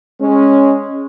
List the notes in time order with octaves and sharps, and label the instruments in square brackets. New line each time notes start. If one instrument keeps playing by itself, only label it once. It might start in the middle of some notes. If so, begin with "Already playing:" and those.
[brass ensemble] G#3 C#4